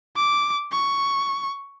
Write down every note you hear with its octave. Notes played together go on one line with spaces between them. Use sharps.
D6
C#6